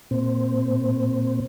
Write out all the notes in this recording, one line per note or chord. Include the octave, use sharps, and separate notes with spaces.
A#2 C4